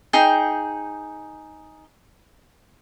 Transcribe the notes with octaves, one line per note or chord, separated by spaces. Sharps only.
D#4 G#4 G5